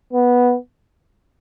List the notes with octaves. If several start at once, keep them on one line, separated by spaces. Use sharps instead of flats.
B3